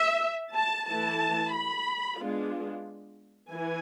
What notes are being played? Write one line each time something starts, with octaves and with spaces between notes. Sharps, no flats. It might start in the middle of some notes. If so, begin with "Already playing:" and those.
Already playing: E5
A5
E3 A3 E4 A5
B5
G#3 B3 D4 F4
E3 G#5